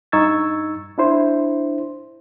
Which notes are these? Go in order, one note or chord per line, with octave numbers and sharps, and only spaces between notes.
G2 D#4 C#6 E6 G#6 A6
D4 E4 C5